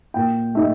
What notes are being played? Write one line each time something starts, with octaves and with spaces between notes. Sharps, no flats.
A#2 G5
A3 D#4